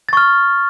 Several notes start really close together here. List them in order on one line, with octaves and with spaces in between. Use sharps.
A6 C#6 F6